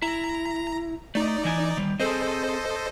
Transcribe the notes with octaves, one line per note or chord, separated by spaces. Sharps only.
E4 A#5
A3 D#4 D5
E3 G#5
D#3 G3
C4 G#4 A4 C5 D#5